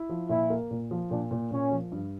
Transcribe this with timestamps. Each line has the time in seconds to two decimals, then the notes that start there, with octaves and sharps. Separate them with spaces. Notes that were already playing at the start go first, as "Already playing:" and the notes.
Already playing: E4
0.09 F3
0.29 A#2 E4
0.50 A#3
0.71 A#2
0.91 F3
1.11 A#2 D4
1.31 A#2
1.51 A#2 C#4
1.71 F3
1.92 G2